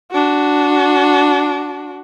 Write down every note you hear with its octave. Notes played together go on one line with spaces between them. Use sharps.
D4 F#4